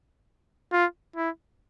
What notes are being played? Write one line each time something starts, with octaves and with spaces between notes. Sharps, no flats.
F4
E4